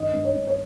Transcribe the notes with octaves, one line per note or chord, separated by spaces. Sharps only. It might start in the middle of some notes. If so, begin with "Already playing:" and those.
Already playing: G2 D#3 D#5
G2
C#5
G2
C#5